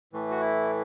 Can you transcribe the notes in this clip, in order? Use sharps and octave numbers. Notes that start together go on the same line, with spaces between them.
A2 E3 A3
F#4
E4